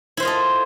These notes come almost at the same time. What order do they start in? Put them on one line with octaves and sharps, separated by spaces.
E4 C5 F4 D#5 A4